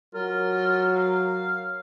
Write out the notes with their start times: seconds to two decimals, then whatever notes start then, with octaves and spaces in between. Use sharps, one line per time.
0.15 F#3 F4 A#4
0.95 F5